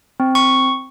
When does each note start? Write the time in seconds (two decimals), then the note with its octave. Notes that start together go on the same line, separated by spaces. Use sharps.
0.20 C4
0.35 C#6